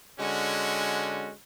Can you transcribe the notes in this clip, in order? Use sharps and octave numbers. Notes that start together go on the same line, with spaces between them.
D3 G#3 C#4 F#4